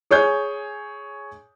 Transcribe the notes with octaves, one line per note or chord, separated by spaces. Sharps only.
G#4 C#5 G#5 G6